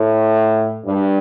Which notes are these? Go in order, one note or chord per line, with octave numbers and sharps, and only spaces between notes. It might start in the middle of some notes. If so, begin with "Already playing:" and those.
Already playing: A2
G2